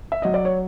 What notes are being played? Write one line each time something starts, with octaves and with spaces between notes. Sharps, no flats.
E5
F#3 D#5
D5
C#5